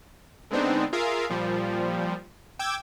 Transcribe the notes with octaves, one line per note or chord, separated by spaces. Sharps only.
D3 G#3 B3 C4 D4 D#4
F4 G#4 A#4 E5 F5
A#2 F3 G3
G5 D6 E6 G#6